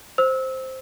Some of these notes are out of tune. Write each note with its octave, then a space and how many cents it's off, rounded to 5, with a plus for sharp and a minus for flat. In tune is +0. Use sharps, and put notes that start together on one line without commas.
C5 +0 E6 -25